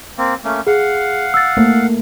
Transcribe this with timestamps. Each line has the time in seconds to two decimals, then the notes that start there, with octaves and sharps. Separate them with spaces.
0.18 A#3 C4
0.44 A3 A#3 C#4
0.67 G#4 F5 F#5
1.34 E6 A6
1.57 A3 A#3